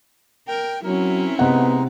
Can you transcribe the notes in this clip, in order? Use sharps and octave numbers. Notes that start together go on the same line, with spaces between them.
A#4 G5
F#3 C4 C#4 E4 A#4
C3 G#3 B3 D#4 F#5